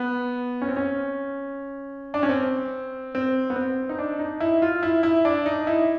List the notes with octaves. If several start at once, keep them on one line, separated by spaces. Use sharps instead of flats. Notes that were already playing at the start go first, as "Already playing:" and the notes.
Already playing: B3
C#4
C4
C#4
D4
C#4
C4
C4
B3
C4
D#4
D4
D#4
E4
F4
E4
E4
D4
D#4
E4